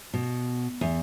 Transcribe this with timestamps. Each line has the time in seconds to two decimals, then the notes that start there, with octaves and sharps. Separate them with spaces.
0.13 B2
0.81 E2